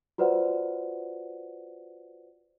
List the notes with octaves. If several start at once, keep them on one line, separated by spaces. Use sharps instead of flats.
F4 F#4 B4 C5 D5 F#5